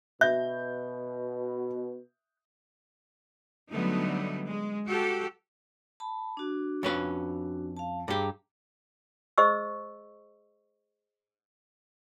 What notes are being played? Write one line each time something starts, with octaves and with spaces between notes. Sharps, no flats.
B2 E5 G6
D3 F#3 G3 A3 B3 D#4
G#3
F#4 G4 A4
A5 B5
D4 F#4
F2 C#4 B4
F5 A5
G2 G4 G#4 G5 A#5
G#4 C5 D#5 C#6 E6